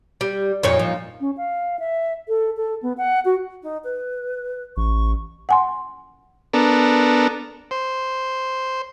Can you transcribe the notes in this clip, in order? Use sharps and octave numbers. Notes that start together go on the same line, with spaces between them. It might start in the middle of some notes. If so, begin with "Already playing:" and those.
G3
F2 A#2 D#4 C#5
F3
C#4
F5
E5
A4
A4
B3
F#5
F#4
D#4
B4
A1 C#6
F#5 G#5 C6
B3 D4 A4 A#4
C5